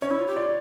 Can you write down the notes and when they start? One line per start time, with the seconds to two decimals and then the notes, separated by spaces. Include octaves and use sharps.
0.02 C#4 C#5
0.11 E4
0.19 F4
0.27 G4
0.36 F4 D5